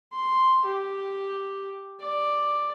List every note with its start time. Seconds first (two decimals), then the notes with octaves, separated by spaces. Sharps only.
0.12 C6
0.65 G4
2.01 D5